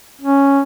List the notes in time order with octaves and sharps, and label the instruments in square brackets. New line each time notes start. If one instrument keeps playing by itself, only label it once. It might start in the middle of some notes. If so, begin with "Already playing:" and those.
[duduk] C#4